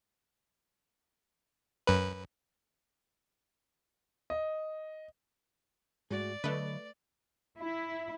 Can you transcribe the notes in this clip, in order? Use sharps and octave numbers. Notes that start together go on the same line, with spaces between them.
F#2 B4
D#5
G#2 A3 F#4 G#4 D5
D3 F#3 A3 B4 D#5
E4